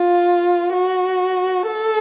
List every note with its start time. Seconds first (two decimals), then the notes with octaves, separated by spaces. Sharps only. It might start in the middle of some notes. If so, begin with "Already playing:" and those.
Already playing: F4
0.73 F#4
1.67 A4